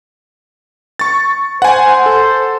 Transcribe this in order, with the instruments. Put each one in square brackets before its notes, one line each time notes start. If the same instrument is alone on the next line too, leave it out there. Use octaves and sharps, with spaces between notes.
[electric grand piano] C#6 A6
[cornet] C5 [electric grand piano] F#5 G#5
[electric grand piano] A4